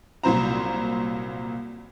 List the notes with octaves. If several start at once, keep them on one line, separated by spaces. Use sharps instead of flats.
C2 A#2 F#3 C5 A#5